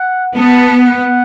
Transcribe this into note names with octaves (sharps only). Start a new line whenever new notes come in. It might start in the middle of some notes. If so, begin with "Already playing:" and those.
Already playing: F#5
B3 A5
F#5